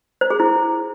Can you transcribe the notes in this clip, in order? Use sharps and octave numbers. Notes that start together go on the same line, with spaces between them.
C5
G#4
E4